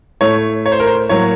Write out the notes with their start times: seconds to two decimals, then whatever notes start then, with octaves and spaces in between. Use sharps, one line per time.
0.21 A2 A3 C#5
0.66 C#5
0.72 C5
0.80 A#4
0.87 C5
1.09 A2 F#3 A#3 C#5